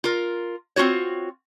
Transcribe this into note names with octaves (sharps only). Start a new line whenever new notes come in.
F4 A#4
C4 C#4 F4 F#4 C#5